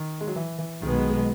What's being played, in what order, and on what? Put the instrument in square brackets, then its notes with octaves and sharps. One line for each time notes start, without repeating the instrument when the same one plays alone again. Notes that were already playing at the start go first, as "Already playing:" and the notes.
Already playing: [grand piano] D#3
G#3
F#3
E3
E3
[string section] B1 B2 G#3 B3 [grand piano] D#3